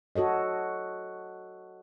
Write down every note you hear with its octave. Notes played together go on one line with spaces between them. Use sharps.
F#4 A4 C#5 D#5